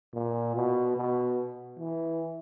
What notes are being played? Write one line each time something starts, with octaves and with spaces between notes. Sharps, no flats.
A#2
B2
B2
E3